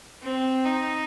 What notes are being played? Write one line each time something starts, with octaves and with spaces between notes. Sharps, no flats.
C4
D#4